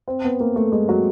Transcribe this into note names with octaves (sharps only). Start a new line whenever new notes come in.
C4
B3
A#3
A3
G#3
F#3